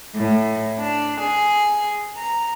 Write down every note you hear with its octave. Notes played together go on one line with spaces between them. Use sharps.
A2
D4
G#4
A#5